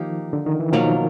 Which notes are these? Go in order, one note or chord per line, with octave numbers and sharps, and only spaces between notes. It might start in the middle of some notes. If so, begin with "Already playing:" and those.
Already playing: D#3 F3 A#3 D#4 G4
D3
D#3
E3
B2 D#3 F3 F#3 A#3